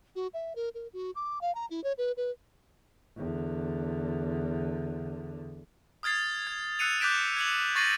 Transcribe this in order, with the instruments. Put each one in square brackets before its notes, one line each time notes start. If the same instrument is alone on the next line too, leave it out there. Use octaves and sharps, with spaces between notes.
[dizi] F#4
E5
A#4
A#4
F#4
D6
F5
A#5
E4
C#5
B4
B4
[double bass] E2 D3
[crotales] D#6 F6 G#6 A6 C7
G#6
E6 F#6 C7 C#7 D#7 F7
D6 F#6 G6 B6 D7 E7
G#6 C#7 F#7
C#6 A6 A#6 C7 D#7 F#7